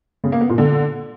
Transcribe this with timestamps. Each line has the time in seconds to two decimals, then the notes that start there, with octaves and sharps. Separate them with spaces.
0.24 C#3
0.32 A#3
0.41 B3
0.49 A#2
0.58 D3